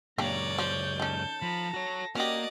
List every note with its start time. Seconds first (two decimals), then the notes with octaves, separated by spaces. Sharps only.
0.18 C#2 F#2 A#3 D4 G4 C#5 D5 A#5
0.59 F3 G6
1.00 D#3 C#4 A4
1.42 F3 A#5 B5
1.74 F#4 C#5 A#6
2.15 A#3 C#4 F#4 G4 D5 D#5